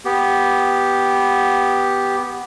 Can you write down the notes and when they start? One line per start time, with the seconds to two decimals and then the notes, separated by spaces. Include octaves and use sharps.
0.05 B3 G4